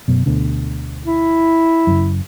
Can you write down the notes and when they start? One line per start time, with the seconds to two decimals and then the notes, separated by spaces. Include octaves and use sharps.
0.08 F#2 B2
0.26 D2 B2 D3
1.06 E4
1.87 F#1 F#2